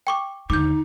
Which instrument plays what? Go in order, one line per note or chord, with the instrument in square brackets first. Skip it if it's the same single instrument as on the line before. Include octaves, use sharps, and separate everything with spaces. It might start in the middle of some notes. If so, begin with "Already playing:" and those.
[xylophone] G5 C#6 D6
[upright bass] D#2 D3 [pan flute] D#4 [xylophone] D6 G6